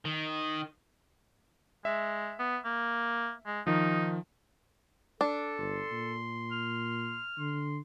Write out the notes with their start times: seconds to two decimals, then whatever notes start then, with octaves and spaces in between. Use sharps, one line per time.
0.05 D#3
1.85 G#3 E5
2.39 B3
2.65 A#3
3.46 G#3
3.67 D#3 F3 D#4
5.21 D4 A4
5.58 G1 C6
5.92 A#2
6.51 F6
7.38 D3 C6